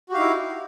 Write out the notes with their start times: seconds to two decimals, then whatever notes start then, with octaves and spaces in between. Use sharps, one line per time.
0.09 F#4
0.12 G4
0.14 F5
0.17 D#4
0.20 E4